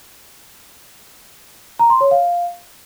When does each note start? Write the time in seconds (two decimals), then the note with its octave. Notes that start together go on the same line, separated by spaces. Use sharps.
1.79 A#5
1.90 C6
2.01 C#5
2.11 F5